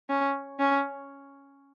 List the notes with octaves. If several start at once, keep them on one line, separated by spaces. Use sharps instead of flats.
C#4
C#4